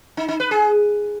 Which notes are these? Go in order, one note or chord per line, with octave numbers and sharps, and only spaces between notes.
D#4
D#4
B4
G#4